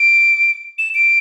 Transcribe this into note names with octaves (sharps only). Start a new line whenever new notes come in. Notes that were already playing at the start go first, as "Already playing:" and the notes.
Already playing: D7
E7
D7